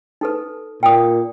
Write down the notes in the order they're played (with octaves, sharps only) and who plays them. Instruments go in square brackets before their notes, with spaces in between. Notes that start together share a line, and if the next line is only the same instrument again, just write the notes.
[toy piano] D#4 A4 B4
[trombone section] A#2 [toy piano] G5 D#6